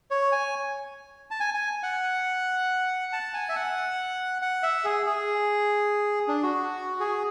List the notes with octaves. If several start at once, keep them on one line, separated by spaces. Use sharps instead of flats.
C#5
G#5
A5
G#5
G#5
F#5
A5
G#5
E5
F#5
F#5
E5
G#4
G#4
D4
F#4
G#4